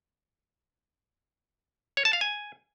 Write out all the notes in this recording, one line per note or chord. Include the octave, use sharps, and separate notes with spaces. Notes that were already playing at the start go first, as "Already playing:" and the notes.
C#5
A5
F5
G#5